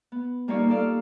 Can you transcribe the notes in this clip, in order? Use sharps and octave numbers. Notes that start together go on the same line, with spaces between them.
B3
G3 A#3 D#4 F4 C#5 D5
A#3 A4 D5 F5